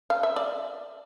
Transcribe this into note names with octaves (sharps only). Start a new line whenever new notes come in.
F5
E5
D5